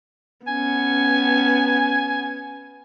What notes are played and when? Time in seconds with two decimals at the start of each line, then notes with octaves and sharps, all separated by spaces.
0.47 B3 C#4 G#5